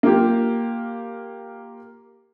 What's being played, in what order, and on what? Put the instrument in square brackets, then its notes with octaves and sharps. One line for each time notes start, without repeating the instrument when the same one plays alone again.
[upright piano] A#3 F4 G4